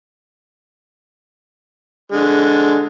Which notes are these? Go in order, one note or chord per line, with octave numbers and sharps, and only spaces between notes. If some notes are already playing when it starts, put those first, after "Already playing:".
D3 G#3